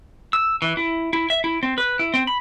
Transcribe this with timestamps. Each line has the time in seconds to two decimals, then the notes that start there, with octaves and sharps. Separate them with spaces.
0.33 E6
0.62 E3
0.77 E4
1.13 E4
1.30 E5
1.44 E4
1.63 C4
1.78 B4
1.99 E4
2.14 C4
2.27 B5